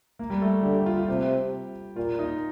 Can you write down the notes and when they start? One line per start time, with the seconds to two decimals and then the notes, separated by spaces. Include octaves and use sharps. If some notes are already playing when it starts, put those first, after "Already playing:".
0.19 A#3
0.30 G3
0.42 A3
0.63 D3 G4
0.74 G4
0.86 F4
0.97 F4
1.08 C3 G4
1.96 A#2 F4
2.19 D#4